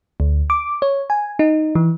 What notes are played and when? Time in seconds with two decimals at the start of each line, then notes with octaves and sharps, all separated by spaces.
0.20 D2
0.50 D6
0.82 C#5
1.10 G#5
1.39 D#4
1.75 E3